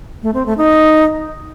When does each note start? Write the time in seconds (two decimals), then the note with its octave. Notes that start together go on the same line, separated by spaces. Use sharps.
0.23 A3
0.34 C4
0.46 A3
0.58 D#4